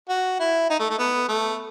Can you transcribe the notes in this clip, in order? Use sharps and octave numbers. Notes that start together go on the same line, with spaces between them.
F#4
E4
D#4
A3
A3
B3
A3